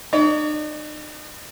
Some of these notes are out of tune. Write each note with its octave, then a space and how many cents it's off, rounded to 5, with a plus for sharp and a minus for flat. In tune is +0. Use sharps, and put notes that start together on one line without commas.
D#4 -45 C#5 +40